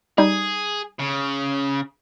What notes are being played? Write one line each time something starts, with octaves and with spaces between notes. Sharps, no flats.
G3 D#4 G#4
C#3